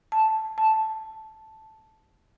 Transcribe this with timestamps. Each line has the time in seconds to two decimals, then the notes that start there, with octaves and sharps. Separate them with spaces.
0.12 A5
0.58 A5